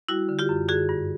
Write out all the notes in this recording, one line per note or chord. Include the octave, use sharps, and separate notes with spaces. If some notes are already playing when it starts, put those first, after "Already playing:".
G3 E4 F#4
D3
F4 G4
F#2
D3 F#4 G#4
G2